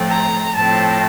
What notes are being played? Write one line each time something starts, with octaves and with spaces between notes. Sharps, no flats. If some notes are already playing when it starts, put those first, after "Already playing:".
Already playing: A2 F3 A3 C4
A#5
A2 F3 C4 A5